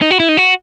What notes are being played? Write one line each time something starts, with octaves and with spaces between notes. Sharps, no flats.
D#4
F#4
E4
D#4
F#4